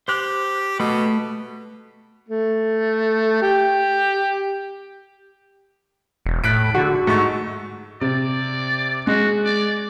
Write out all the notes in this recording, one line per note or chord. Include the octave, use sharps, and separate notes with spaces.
G4 C5 F#6
B2 A3 B4
A3
G4
E1
A2 F#6 B6 D7
D3 F#4
G#2 A3 C#6
C3 D5
G#3 F#4
D5